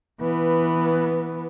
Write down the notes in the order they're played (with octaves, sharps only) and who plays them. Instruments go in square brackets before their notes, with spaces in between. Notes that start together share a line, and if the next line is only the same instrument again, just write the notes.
[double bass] E3 B3